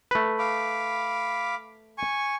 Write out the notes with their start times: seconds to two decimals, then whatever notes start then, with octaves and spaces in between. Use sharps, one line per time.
0.11 A3 B4
0.39 F5 B5 D6
1.98 G#5 C#6